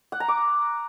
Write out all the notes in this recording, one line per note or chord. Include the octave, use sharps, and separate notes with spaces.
F#5
A#5
D6